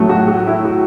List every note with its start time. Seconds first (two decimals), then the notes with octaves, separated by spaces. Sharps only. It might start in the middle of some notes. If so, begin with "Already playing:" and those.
Already playing: A2 F#3 A3
0.09 F#4
0.28 F#4
0.47 E4
0.65 F#4